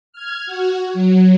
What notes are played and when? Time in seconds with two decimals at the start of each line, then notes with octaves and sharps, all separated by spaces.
0.12 F6 G#6
0.46 F#4
0.94 F#3